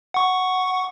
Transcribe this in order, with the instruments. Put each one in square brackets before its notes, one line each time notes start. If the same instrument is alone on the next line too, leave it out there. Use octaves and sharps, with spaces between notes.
[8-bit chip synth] F#5 C#6